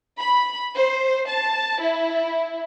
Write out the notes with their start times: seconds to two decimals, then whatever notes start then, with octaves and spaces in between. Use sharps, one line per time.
0.19 B5
0.75 C5
1.28 A5
1.82 E4